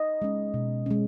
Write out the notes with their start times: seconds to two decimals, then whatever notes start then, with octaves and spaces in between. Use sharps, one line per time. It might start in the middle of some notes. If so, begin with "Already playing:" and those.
Already playing: D#5
0.22 G#3 C#4
0.54 B2
0.86 G#3 C#4